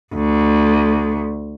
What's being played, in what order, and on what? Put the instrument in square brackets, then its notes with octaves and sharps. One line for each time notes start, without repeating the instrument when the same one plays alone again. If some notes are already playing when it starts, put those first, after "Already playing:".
[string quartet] D2